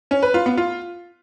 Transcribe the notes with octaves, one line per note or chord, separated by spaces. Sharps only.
C#4
B4
F4
B3
F4